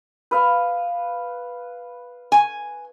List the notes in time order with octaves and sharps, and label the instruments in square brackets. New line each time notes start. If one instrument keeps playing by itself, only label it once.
[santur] B4 F5
[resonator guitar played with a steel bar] G#5